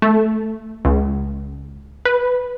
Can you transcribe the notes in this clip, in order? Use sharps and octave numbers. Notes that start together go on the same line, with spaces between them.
A3
C#2
B4